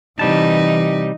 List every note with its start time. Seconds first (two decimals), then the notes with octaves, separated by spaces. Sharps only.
0.19 C3 E3 G3 D#4 A5